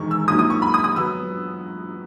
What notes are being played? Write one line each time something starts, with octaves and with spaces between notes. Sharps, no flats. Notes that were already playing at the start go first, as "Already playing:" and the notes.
Already playing: E1 E2 D#3 G#3 C#6
E6
A#1 G#2 F#3 A#3 D#6
D#6
C#6
B5
D#6
D#6
F#3 B3 E6